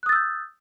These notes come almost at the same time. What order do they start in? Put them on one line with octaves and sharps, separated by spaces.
F#6 D#6 A6 E6 G6